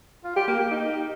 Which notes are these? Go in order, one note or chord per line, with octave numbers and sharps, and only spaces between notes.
F4
G4
A#3
G4
D#4